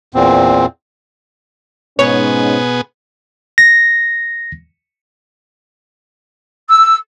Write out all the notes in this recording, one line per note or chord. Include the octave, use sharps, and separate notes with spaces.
E2 A#2 C4
G#2 B2 B3 C#4 G#4 C#5
A#6
E6